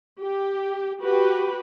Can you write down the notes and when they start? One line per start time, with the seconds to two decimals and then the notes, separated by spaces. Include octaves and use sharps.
0.20 G4
1.02 F#4 G4 B4